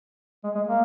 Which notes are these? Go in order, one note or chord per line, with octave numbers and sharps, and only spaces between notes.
G#3
G#3
A#3